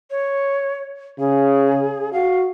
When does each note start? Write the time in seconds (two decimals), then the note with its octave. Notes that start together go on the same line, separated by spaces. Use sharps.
0.10 C#5
1.19 C#3 G#4
2.13 F#4 F5